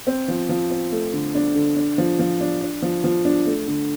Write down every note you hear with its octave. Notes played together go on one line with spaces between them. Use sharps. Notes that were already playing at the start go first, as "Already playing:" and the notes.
C4
F3
F3
C4
A3
D3
D4
D3
D4
F3
F3
D4
D4
F3
F3
D4
A3
D3